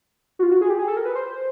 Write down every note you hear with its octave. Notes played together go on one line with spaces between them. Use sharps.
F#4
F4
F#4
G#4
G4
G#4
A4
A#4
B4
C5